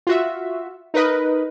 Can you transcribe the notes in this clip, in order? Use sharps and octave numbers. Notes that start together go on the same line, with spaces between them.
F4 F#4 E5
D#4 A#4 B4 D#5